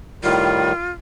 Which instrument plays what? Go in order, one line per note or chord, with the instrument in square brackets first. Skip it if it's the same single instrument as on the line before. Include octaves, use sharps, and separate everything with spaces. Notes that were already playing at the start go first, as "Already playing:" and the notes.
[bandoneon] A2 D#3 G3 [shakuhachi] F4